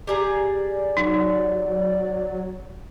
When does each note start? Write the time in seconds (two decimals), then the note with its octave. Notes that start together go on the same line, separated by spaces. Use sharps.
0.07 G4 G#4 D5 A#5
0.97 F#3 D#4